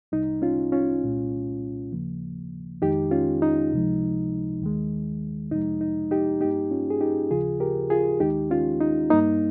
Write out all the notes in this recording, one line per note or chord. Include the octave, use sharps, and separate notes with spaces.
C2 C3 G3 D#4
C#4 F4
C#4 F4
C2 A#2 G#3
D#2 C#3 F3 A#3
F2 D#3 G#3 D#4 G4
C#4 F4
D#4
C#2 C3 F3 G#3
D#2 D#3 G#3
F2 C3 F3 G#3 D#4
D#4
D#4 G4
G2 G3 A#3 D#4 G4
C#4 F4
G#4
D#4 G4
D#2 C#3 F3 F4 G#4
G4 A#4
F4 G#4
D#2 D#3 G#3 D#4 G4
C#4 F4
D#4
G2 G3 A#3 D#4